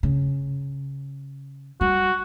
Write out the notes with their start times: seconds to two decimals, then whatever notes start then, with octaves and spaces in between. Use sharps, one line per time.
0.03 C#3
1.81 G3 F#4